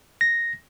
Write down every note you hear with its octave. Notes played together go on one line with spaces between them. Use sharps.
A#6